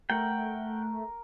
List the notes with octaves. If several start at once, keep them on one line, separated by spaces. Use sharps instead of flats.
A3 A#4 F#5 G5